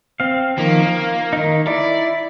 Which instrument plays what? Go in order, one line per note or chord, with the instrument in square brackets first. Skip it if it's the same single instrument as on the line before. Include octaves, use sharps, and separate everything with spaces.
[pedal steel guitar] C4 F5
[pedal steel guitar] D#3 F3 [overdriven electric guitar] A#3
[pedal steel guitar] F5
D#3 D#4
[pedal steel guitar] E4 [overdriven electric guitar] D5